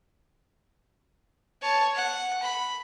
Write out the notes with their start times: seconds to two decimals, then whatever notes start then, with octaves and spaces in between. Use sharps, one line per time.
1.62 C#5 A5
1.95 F#5
2.43 B5